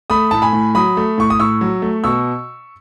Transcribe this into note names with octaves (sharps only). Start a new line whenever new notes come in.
A3 B5 D#6
A2 A5
G#5 B5
A2
F#3 B5 D#6
A3
A2 C#6
D#6
A2 C#6 E6
F#3
A3
B2 C#6 E6